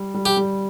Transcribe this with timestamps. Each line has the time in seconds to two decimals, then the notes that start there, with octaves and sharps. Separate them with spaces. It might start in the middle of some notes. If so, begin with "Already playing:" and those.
Already playing: G3
0.15 G3
0.26 G4
0.37 G3